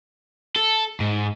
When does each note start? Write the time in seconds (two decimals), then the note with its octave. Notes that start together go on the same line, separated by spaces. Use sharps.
0.56 A4
1.00 G#2